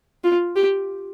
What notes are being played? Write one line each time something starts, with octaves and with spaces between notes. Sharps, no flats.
F4
G4